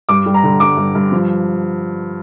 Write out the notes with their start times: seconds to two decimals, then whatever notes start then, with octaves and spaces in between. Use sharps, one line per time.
0.09 G2 D6
0.26 G3
0.34 A#5
0.43 D3
0.60 G2 D6
0.77 G2
0.95 G2
1.12 F3